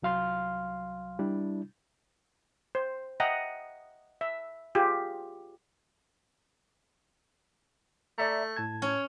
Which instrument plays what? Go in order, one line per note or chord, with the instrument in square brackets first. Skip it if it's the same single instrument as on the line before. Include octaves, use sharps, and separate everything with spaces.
[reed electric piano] C2 F#3 F5 C6 F6
G3 D4 E4
[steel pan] C5
D#5 E5 F#5 G5 A#5
E5
F4 G4 G#4
[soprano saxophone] A3 [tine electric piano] D5 E5 A#5
[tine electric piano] A2 A5 G#6
[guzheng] C#4 [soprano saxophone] C#5